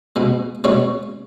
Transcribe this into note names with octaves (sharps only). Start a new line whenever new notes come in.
B2 G#3
B2 G#3 C#5